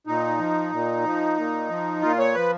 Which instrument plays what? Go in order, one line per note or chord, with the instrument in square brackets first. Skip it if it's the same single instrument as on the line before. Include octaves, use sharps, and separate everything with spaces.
[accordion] A#2 D#4
F3
A#2
F3
A#2
F3
A#2 F4
C#5
F3 B4